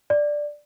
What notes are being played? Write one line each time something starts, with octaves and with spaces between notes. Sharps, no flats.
D5